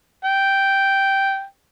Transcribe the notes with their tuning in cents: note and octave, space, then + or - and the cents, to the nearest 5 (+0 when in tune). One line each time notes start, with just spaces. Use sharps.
G5 -5